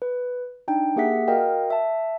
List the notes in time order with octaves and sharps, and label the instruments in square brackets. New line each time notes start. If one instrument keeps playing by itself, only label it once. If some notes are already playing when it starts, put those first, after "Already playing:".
[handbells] B4
D4 D#4 G5
A#3 G4 G#4 E5 F#5 B6
F#4 A#4 D#5 F5 G5
E5 A5